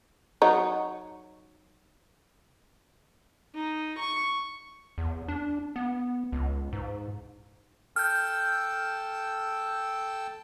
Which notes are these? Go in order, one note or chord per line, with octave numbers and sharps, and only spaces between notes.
F#3 D#4
D#4
C#6
E2
D4
B3
C#2
G#2
A4 G5 E6 F6 G6